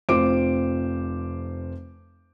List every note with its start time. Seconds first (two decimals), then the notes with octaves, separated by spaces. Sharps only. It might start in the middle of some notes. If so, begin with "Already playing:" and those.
0.09 F1 C4 F4 C5 D6 D7